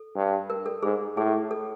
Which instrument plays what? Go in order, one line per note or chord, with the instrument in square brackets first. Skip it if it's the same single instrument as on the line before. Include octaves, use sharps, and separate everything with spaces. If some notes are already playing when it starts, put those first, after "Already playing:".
Already playing: [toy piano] A4
[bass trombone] G2
[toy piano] A#4
A4
[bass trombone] G#2 [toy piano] G#4
[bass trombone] A2 [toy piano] G#4
[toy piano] A4